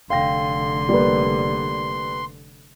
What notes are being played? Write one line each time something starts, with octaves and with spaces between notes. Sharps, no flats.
F1 D3 F5 G5 C6 A#6
G3 A#3 B4